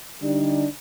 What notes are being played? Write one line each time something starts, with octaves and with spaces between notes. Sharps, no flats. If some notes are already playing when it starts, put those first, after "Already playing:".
D3 G3 D4 D#4